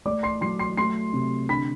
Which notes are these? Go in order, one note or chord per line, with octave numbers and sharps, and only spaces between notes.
A3 D5 D6
C6 C7
F#3 C6 C7
C6 C7
A3 C6 C7
C3
D3 B5 B6